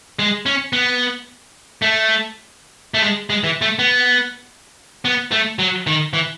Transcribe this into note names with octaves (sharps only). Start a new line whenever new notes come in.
G#3
C#4
B3
A3
A3
G#3
G#3
E3
A3
B3
B3
A3
F#3
D#3
E3